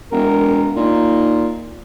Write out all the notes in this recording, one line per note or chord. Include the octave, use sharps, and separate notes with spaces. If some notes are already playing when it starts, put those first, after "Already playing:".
E1 A#4
A#2 D#4